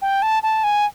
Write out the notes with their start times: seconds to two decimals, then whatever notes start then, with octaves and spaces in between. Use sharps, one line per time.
0.02 G5
0.22 A5
0.43 A5
0.64 G#5